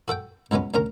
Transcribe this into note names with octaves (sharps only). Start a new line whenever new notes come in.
F#4 A4 F#5 G5
C#2 F#3 G#3 B3 C#4
D2 C#4 A#4 A#5